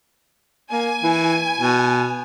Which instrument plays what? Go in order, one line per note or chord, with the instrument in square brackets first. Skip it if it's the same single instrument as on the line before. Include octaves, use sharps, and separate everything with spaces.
[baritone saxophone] A#3 [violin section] G#5
[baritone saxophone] E3
B2